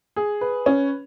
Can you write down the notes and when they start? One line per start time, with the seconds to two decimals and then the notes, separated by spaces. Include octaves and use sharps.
0.16 G#4
0.41 B4
0.66 C#4